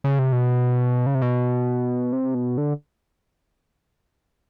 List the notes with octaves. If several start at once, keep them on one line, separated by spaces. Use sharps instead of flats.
C#3
C3
B2
C#3
C3
B2
C3
B2
D3